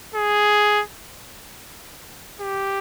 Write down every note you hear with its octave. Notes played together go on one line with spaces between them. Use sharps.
G#4
G4